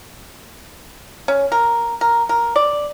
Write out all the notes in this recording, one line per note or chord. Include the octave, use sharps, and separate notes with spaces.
C#4
A#4
A#4
A#4
D5